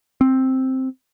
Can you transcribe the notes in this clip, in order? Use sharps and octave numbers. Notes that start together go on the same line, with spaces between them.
C4